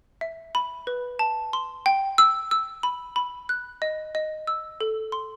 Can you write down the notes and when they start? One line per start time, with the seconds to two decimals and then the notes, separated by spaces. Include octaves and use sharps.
0.21 E5
0.55 B5
0.87 B4
1.19 A5
1.53 C6
1.86 G5
2.18 E6
2.51 E6
2.83 B5
3.16 B5
3.49 F#6
3.82 D#5
4.15 D#5
4.47 E6
4.81 A4
5.12 C6